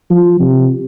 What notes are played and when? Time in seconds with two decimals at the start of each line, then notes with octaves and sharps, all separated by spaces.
0.10 F3
0.40 C3